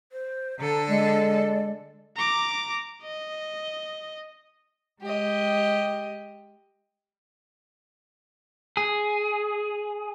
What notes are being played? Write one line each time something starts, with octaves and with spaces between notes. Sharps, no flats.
C5
D3 A4 A#5
G#3 D5
A#5 D6
D#5
G#3 G4 D#5
G#4